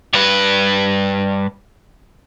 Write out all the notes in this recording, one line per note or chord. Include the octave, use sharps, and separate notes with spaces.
G2 B4